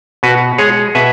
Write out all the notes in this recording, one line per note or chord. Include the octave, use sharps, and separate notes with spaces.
B2 F#4 B4
G#3 G#4 C#5
B2 B4 E5